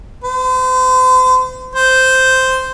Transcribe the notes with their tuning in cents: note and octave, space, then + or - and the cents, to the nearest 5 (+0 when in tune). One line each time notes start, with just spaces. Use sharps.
C5 -40
C5 -5